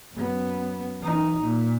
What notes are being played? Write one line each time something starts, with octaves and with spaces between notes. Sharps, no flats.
F#2 B3
E3 D#4
A#2